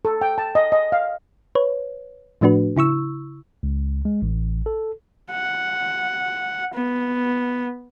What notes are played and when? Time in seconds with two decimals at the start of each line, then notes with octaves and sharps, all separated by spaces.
0.05 A4
0.21 G5
0.38 A5
0.55 D#5
0.72 D#5
0.92 F5
1.55 B4 C#5
2.41 A2 F3 A3 D4 F#4 B4
2.77 C#3 E4 C#6 E6
3.63 C#2
4.05 G#3
4.22 A1
4.66 A4
5.31 F#5
6.74 B3